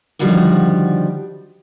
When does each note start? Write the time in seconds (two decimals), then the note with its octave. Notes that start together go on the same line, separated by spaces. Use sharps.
0.19 D3 D#3 F3 G3 F#4 G4